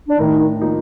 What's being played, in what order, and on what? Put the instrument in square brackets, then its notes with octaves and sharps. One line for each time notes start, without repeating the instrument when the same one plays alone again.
[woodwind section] D4
[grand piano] A2 [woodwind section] D#3 D#4
[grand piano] F3 A#3 D#4